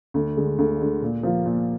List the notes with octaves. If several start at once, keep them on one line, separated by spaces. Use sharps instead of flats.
D2
D3 G#3
D2
D3 G#3
A#2
F3 A#3 F4
A#2